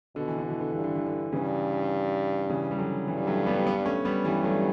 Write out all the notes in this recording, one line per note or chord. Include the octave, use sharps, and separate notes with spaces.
B2 D3
E3
D3
B2
E3
D3
G2 E3
D3
E3
D3
G2 C#3 E3
C#3 E3
G3
D3 F#3
G2 E3 G3
F#3 A3
G3 B3
B3 D4
A3 C#4
G3 B3
G2 E3 G3
F#3 A3